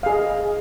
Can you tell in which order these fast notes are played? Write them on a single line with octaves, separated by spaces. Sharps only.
F5 G#4 D#5